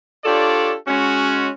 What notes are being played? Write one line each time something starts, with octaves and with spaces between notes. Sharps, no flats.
D4 F4 G4 A4 C#5 D5
G#3 C#4 F#4